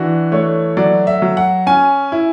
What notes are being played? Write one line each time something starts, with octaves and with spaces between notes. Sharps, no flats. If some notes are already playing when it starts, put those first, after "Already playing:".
Already playing: E3 D4 F#4
A3 C#5
F#3 D5
E5
F#3
F#5
C#4 G#5
E4